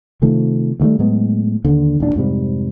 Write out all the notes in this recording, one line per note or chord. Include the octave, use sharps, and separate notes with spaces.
C3 D#3 F3 A3
D2 D#3 G3 A3
A2 F#3 G#3 B3
D#2 D3
E1 A#1 D4
F2 G#2 C3 G3